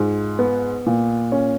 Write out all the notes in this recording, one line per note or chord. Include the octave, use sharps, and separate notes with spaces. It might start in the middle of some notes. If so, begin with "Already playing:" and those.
Already playing: G#2 F4
B3
A#2
C#4